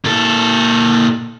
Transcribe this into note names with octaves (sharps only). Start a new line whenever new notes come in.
A#2 A4